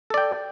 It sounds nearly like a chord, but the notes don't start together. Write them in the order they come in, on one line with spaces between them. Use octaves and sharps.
A4 D5 G5